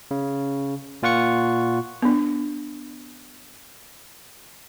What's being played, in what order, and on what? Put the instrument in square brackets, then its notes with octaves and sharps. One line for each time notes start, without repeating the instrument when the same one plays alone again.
[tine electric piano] C#3
A#2 F4 F#5 C#6 C#7
[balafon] B3 D4